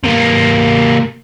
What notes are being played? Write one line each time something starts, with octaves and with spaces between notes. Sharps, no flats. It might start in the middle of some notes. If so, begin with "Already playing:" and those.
C3 A#3